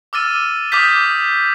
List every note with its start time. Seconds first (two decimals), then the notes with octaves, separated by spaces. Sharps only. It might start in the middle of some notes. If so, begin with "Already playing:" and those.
0.13 D6 E6 F6 A6 D#7
0.72 D6 D#6 F6 G6 B6